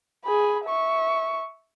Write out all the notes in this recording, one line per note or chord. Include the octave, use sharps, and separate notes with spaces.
G#4 B5
E5 C#6